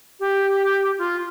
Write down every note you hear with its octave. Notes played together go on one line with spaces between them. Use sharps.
G4
F4